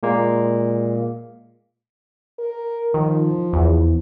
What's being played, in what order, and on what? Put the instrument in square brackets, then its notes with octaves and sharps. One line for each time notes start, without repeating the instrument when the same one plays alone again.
[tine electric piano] A#2 G#3 A#3
[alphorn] A#4
[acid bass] D#3 [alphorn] F3
[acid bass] E2